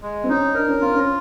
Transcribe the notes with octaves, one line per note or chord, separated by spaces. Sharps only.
G#3
C4
C#4 D#4
D4 A#4
C#4
C4 F4
C#4